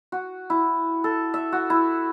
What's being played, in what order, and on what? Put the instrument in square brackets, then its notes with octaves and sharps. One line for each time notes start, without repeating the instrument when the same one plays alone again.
[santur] F#4
E4
A4
E5
F#4
E4